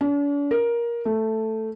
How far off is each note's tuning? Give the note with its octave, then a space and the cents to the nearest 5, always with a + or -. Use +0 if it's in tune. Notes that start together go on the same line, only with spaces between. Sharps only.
D4 -45
A#4 +15
A3 +5